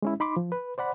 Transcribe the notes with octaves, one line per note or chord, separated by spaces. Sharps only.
G#3 C#4 E4
D#4 B5 C6 D6
F3
B4
C5 D5 F#5 B5